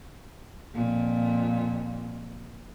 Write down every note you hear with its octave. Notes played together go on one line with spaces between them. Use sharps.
F2 A#2